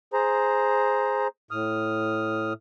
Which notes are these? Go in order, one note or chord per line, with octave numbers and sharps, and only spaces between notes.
G#4 C5 A#5
A2 D#6 F6